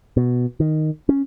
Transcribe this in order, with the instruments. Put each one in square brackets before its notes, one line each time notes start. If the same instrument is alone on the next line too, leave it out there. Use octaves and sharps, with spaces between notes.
[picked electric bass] B2
D#3
C#4